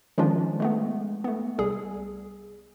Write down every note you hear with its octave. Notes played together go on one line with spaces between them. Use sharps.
D#3 F3 G#3 C#4 D4 F4
G#3 A3 B3
A3 B3
C2 G3 G#4